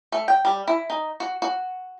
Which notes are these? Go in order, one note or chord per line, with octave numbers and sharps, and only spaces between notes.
A3
G5
G3
E4
D#4
F#4
F#4